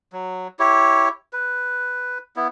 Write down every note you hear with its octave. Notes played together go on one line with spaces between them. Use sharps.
F#3
E4 G4 C#5
B4
B3 E4